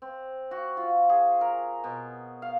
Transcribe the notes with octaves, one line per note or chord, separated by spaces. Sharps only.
C4
F#4
F4
G#4
A#4
B2
F5